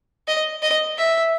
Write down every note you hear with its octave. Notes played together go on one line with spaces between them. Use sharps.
D#5
D#5
E5